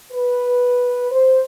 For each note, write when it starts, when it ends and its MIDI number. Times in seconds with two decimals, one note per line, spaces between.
0.11 1.06 71
1.10 1.38 72